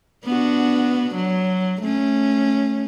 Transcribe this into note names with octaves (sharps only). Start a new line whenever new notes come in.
B3 D4 F#4
F#3
A3 C#4